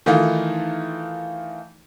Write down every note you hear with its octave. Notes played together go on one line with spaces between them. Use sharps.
D#3 E3 A3 D#4 F4